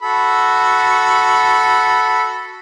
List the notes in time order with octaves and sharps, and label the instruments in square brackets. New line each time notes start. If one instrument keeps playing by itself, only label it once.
[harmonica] F#4 A4 B5